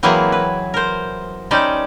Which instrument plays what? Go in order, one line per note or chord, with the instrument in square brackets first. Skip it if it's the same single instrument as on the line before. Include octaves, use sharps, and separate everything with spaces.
[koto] E3 F#3 A#3 C4 E4 G#4
B4
A#4 C5
G3 C#4 D#4 C5 D5